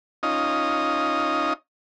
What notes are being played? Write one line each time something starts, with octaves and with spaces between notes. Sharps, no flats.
C#4 D#4 F4 D#5